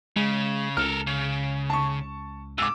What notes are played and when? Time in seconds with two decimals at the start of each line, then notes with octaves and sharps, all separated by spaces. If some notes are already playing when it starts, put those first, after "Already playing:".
0.16 C#3 G#3
0.77 C#2 A4 A#4 F6
1.07 C#3
1.70 A5 C#6
2.58 G#2 D6 E6